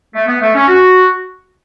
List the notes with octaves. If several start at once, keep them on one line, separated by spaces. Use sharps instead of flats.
A3
B3
A3
C#4
F#4